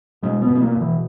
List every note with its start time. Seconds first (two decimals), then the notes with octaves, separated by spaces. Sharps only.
0.23 B2 G#3
0.42 B3
0.48 B2
0.55 B3
0.62 A#3
0.75 B2
0.81 E3